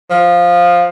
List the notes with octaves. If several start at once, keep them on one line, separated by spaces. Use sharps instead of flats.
F3